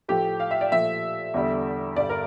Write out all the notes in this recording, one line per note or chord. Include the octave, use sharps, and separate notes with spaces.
A2 F3 A3 G4
F5
E5
D5
A#2 F3 A3 E5
E2 D3 G3
G2 D3 G3 D5
A#4